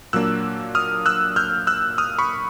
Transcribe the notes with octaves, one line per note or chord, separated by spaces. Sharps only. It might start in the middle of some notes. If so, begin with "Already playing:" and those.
A#2 F#3 A#3 D4 E6 F#6
D#6 F6
E6 F#6
F6 G6
E6 F#6
D#6 F6
B5 C#6